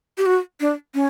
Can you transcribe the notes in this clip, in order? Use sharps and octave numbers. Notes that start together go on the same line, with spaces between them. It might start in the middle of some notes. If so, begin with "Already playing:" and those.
G4
F#4
D4
C#4